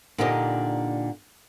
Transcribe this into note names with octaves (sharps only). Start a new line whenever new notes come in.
A#2 D3 D#4 G4 A4 D#5